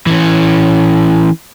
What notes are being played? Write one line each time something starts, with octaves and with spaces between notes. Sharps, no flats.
E3 C#4